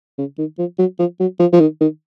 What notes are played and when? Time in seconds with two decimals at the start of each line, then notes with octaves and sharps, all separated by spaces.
0.18 C#3
0.38 D#3
0.59 F3
0.79 F#3
0.99 F3
1.20 F#3
1.40 F3
1.53 F3
1.60 D#3
1.81 D#3